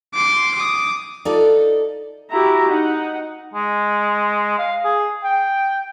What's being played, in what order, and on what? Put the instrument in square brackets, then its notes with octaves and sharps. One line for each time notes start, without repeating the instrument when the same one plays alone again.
[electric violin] C6 D6
D6 D#6
[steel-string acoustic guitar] D#4 F4 A4 D5
[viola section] E4 F#4 G4 E5 A#5
D#4 F#5
[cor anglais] G#3
F5
G#4
G5